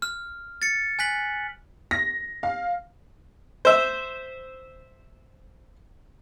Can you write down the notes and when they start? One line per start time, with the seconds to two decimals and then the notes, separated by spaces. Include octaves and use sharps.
0.02 F6
0.62 A6 C#7
0.99 G#5 F#6 B6 F#7
1.91 A#6
2.43 F5
3.65 C5 E5